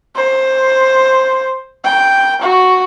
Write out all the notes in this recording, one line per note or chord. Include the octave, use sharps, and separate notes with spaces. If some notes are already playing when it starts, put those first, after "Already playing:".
C5
G5
F#4